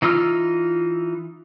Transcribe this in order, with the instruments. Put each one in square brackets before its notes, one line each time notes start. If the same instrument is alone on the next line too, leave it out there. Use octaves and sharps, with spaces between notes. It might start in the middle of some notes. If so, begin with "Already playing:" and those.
[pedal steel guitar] E3 D#4 F4 E6 F6